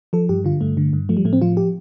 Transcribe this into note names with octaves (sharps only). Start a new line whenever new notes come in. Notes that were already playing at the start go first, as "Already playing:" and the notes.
F3 A4
G2 G4
D3 F4
G2 A3
D3
G2
F3 A3
G3
A2 A3
C4
F3 F4
G4